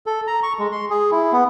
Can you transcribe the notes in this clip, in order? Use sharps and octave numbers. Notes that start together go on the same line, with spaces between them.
A4
A#5
C#6
G#3
C6
G#4
E4
B3